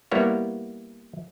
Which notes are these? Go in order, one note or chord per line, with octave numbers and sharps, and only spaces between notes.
G3 A#3 B3 E4 C#5